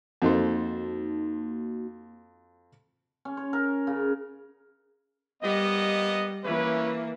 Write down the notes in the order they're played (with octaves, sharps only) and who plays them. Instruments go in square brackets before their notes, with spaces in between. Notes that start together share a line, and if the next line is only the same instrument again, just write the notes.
[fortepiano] F2 A4 C5 [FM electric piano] A#3 D#4 F#4
[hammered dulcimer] C#4
C#5
A#4
C#3
[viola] G3 [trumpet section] A#3 B3 D#5
[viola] E3 A#3 [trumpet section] C#4 E4 B4